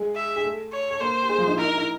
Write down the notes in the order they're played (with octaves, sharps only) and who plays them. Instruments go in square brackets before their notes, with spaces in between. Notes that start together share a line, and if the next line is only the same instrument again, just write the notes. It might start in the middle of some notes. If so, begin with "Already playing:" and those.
Already playing: [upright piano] G#3 G#4
[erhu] E5
[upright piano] G#4
A3 A4
[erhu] C#5
[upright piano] A4
[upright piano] A#3 A#4 [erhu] C5
[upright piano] G4
G#3 G#4
F3 F4
D#4
[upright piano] E4 [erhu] A#4
[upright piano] D#4
E4